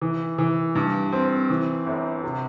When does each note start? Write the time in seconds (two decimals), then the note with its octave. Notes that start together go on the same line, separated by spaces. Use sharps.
0.02 E3
0.38 E3
0.75 G2
1.12 C4
1.50 E3
1.86 G1
2.24 C3